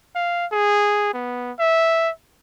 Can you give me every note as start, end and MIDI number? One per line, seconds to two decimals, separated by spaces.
0.15 0.46 77
0.52 1.10 68
1.14 1.52 59
1.59 2.10 76